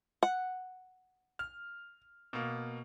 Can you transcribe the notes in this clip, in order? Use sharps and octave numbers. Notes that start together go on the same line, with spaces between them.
F#5
F6
B2 A#3